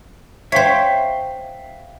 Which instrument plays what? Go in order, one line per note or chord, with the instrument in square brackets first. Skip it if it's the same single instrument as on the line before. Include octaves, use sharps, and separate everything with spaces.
[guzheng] C5 C#5 [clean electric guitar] E5 F5 G5